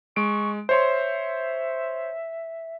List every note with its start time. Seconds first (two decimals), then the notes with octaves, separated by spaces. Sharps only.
0.16 G#3 C#6 D7
0.69 C5 C#5 E5 C6